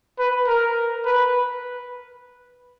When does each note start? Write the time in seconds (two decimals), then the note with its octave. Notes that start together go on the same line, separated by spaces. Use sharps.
0.19 B4
0.48 A#4
1.06 B4